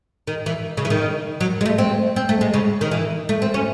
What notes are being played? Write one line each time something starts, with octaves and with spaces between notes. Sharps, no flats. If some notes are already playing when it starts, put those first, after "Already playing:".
D#3
E3
C#3
E3
D#3
F#3
G#3
A3
C4
C4
A3
G#3
C#3
D#3
E3
A3
C4
C#4